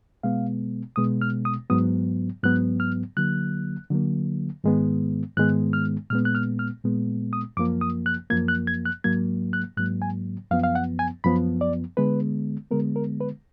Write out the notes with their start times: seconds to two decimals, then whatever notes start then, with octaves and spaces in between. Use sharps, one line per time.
0.23 B2 G#3 B3 F5
0.96 B2 G#3 B3 D#6
1.22 F6
1.45 D#6
1.70 G#2 F#3 B3 D#6
2.44 G#2 F#3 B3 F#6
2.80 F6
3.17 D3 F#3 A#3 F#6
3.90 D3 F#3 A#3
4.64 G#2 D#3 G#3 B3
5.37 G#2 D#3 G#3 B3 F#6
5.73 F6
6.10 A#2 G#3 B3 F6
6.25 F#6
6.35 F6
6.59 F6
6.84 A#2 G#3 B3
7.33 D#6
7.57 F#2 F3 A#3 D6
7.81 D#6
8.06 F#6
8.30 F#2 F3 A#3 G#6
8.48 F#6
8.67 G#6
8.85 F#6
9.04 G#2 F#3 A#3 G#6
9.53 F#6
9.77 G#2 F#3 A#3 F#6
10.02 G#5
10.51 F#2 F3 B3 F5
10.64 F5
10.75 F#5
10.99 G#5
11.24 F#2 F3 B3 B5
11.61 D5
11.97 D3 G#3 B3 B4
12.71 D3 G#3 B3 A#4
12.96 A#4
13.20 B4